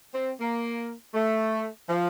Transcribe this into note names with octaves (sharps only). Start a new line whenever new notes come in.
C4
A#3
A3
F3